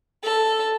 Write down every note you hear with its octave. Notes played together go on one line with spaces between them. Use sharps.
A4